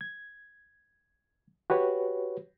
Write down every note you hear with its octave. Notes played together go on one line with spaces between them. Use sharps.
G#6
F#4 G4 B4 C#5